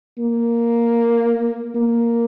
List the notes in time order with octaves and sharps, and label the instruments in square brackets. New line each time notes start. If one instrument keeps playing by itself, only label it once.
[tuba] A#3
A#3